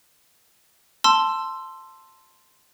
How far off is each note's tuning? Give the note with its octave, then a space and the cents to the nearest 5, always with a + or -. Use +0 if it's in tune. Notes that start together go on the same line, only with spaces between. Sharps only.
A5 +5 C6 +0 E6 +20